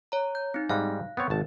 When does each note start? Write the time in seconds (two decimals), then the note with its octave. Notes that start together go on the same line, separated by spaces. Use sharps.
0.12 C#5 A#5
0.35 G6
0.54 C4 D#4
0.69 G#2 G3 F5 F#6
1.17 B3 C4 C#5
1.30 G#1 A5